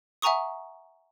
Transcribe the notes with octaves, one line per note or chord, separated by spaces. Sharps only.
E5 F#5 G#5 A#5 C#6 D#6